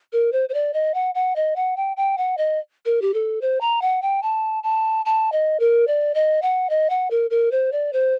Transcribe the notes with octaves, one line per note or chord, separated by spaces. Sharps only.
A#4
C5
C5
D5
D#5
F#5
F#5
D#5
F#5
G5
G5
F#5
D#5
A#4
G4
A4
C5
A#5
F#5
G5
A5
A5
A5
D#5
A#4
D5
D#5
F#5
D#5
F#5
A#4
A#4
C5
D5
C5